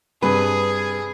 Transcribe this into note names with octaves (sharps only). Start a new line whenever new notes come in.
G2 C3 G#4 B4